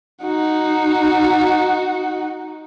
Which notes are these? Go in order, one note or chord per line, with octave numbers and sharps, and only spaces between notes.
D#4 F#4